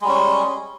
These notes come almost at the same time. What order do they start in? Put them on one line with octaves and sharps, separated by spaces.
G#3 G3 C#4